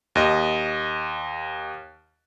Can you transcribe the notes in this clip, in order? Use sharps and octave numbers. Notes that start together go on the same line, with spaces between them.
D#2 D#5